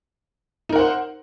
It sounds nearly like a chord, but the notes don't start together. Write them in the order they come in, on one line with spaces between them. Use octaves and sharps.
D#4 A#4 F#5 C5